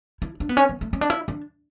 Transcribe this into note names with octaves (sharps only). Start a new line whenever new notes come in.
E4
D4
B3
C#4
B3
A3
C#4
D4
E4
D4